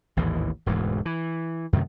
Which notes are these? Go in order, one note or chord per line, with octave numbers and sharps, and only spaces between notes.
A1 D#2 G#2 E3
E1 D2 G#2 E3
E3
F#2 C3 D#3 A3